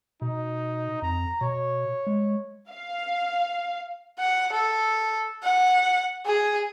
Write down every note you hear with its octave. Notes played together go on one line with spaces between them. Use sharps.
B2 D#4
F2 A#5
B2 C#5
G#3
F5
F#5
A4
F#5
G#4